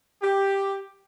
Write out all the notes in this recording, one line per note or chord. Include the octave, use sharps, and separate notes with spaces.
G4